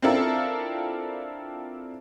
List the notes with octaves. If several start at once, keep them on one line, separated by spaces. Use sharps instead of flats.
C4 D4 E4 F4 A4 A#4